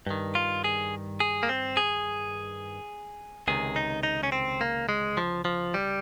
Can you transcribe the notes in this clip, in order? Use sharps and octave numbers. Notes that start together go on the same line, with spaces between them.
G2 D#3
F4
G#4
G#4
A#3
C4
G#4
C#2 C3 D#3 G#4
D#4
D#4
C#4
C4
A#3
G#3
F3
F3
G3